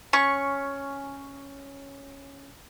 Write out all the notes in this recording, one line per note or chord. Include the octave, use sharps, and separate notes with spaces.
C#4 C#6